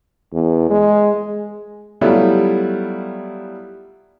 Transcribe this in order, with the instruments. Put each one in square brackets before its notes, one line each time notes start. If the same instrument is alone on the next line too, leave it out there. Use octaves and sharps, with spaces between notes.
[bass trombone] E2
G#3
[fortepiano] F#3 G3 A3 B3 E4 F4